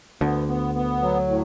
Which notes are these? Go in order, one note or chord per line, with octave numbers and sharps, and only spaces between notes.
D2 D3 B3
B3
B3
F#3
A2